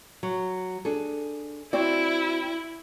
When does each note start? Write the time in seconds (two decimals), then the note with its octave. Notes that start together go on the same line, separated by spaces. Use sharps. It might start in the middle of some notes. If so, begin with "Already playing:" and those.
0.23 F#3
0.85 D4 G#4 A4
1.73 C4 E4 F#4 D5